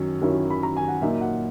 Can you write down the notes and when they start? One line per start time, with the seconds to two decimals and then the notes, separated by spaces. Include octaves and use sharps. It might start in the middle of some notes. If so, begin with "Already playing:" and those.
Already playing: F#2 D#3 F#3 C#4
0.22 F#2 D#3 F#3 C#4 E4
0.50 B5
0.63 A#5
0.77 G#5
0.88 F#5
1.02 A#2 F#3 A#3 D#4 E5
1.21 F#5